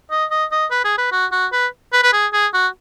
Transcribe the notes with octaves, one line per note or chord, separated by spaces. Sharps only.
D#5
D#5
D#5
B4
G#4
B4
F#4
F#4
B4
B4
B4
G#4
G#4
F#4